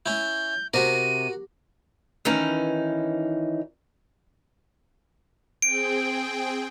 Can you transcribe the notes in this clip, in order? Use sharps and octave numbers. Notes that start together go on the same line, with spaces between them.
C#4 E4 G6
C3 F#4 A#4 D#7
D#3 E3 C#4 D#4
C4 G#4 G5 D7